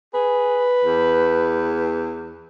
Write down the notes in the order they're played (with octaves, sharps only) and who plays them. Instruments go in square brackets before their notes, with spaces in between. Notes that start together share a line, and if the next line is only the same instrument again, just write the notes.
[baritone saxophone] G#4 [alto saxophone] B4
[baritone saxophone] E2